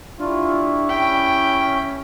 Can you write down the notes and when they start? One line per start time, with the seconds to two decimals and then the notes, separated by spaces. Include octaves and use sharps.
0.19 D4 E4 F4 G4 C#6
0.89 C#4 G5 B6